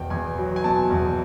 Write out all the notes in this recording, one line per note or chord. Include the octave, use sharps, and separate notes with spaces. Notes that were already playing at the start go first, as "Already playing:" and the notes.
Already playing: E2 B2 G5
E2 G#5
F#3
G#5
B2 A5
E2